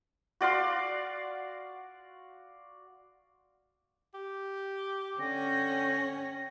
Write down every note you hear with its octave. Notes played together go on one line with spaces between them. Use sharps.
F#4 D5 F5 C6
G4
D3 C#4 G5 A#6